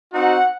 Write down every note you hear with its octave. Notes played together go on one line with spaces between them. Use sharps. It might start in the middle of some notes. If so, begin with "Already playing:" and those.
C4 D#4 F#4 F#5